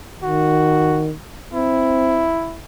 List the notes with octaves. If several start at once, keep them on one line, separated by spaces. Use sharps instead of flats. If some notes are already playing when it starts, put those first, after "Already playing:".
D#3 F#4
C4 E4